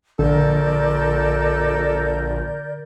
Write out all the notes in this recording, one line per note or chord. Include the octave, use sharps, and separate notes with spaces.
A#1 D3 A4 A#4 D5 G6